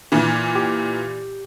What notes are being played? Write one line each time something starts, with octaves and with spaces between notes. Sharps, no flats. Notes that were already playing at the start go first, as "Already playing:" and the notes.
A#2 E3
G4